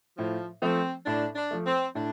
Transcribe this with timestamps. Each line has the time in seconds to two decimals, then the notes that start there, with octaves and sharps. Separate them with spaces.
0.18 A2 F3
0.62 F3 A3 C4
1.06 A2 D4
1.36 D4
1.51 F3 A3
1.66 C4
1.95 A2 D4